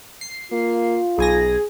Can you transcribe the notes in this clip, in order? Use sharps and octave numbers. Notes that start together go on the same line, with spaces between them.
C7
A#3 F4
B1 G#4 G#5 A#6